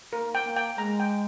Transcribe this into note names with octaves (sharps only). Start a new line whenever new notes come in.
A#3 A#4
G5
A#3
G5
G#3 A#5
G5